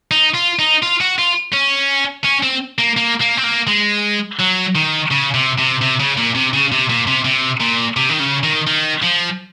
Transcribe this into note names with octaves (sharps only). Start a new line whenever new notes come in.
D#4
F4
D#4
F4
F#4
F4
C#4
C#4
C4
A#3
A#3
A#3
C4
A#3
G#3
F#3
D#3
C#3
C3
C3
C3
C#3
A#2
C3
C#3
C3
A#2
C3
C3
A#2
C3
D#3
C#3
D#3
D#3
F3